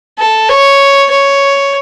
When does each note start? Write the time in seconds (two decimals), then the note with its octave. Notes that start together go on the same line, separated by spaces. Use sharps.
0.18 A4
0.49 C#5
1.10 C#5